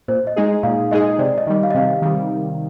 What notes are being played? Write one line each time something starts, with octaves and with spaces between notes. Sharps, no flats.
A#2 C5
D#5
G#3 D#4 G#4
D#5
A#2 F5
G#3 D#4 G#4 D#5
C3 D5
D#5
D#3 G3
F5
D#5
C3 F5
D#3 G3